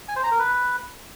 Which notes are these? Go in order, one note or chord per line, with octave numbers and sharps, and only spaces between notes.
G#5
C5
A#5
A#4
B4